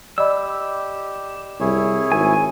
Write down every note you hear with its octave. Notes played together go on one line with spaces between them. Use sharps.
G4 D5 D#5 B5 E6
C2 E4 G#4 C#5
G#1 G#5